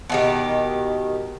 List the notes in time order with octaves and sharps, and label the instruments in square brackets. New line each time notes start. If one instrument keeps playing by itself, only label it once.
[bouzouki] B2 D#3 G4